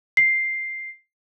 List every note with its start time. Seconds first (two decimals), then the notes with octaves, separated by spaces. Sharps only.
0.17 C7